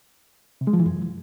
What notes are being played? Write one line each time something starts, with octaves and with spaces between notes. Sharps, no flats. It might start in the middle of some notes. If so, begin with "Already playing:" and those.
C3
G#3
F3
E3
F#2